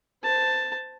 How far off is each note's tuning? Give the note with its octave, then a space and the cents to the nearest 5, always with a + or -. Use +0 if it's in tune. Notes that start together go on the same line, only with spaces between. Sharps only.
C5 -20 A5 +5